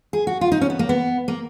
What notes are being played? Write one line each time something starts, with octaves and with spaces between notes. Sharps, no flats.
G#4
F#4
F4
D#4
C#4
B3
A#3
B3
A#3